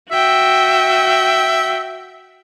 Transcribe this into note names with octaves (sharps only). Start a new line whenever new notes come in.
F#4 E5 G5